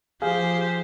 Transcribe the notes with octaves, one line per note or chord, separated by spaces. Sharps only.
F3 G4 G#4 C5 F5